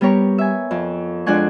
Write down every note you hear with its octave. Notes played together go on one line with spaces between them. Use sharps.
G3 B3 G4 A#4 C#5
E5 G#5
F2
F2 G#3 D4 F#5 G#5 C#6